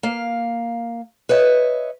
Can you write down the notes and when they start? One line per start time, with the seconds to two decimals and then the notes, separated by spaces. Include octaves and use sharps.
0.03 A#3 F5
1.29 B4 C#5 D#5 E5